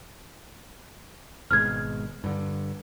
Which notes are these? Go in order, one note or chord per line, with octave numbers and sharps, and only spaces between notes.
G#1 B2 G#3 F6 G#6
G2 D3